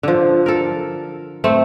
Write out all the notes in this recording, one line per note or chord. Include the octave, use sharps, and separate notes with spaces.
D3 F3
A4 A#4
A3 C4